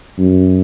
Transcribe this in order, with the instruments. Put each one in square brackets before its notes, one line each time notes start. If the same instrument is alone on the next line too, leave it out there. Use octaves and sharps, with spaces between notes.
[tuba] F#2